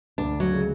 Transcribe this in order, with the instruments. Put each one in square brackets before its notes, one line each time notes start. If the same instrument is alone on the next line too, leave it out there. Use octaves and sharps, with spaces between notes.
[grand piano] D2 [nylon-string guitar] D4
[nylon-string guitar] F#3
[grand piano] C#3 G#3